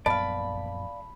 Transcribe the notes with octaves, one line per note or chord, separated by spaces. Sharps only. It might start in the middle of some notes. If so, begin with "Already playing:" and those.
A#1 F#2 B3 D5 F5 A5 B5